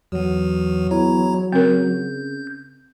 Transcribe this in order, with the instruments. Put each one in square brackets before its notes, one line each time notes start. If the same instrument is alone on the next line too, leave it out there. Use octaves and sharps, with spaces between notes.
[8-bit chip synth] E2 E3 [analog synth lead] F#3
[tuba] E2 [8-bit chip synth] E4 C#5 A#5
[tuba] C#3 [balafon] C4 A#4 [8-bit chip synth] G6